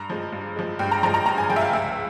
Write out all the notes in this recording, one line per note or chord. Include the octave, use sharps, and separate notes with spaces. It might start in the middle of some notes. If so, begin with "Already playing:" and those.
Already playing: G2 A#5
F3 G#3
G2
F3 G#3
G2 G5
A#5
F3 G#3 A#5
A#5
G2 A#5
G#5
F3 G#3 G5
E5
F5
C#2 E5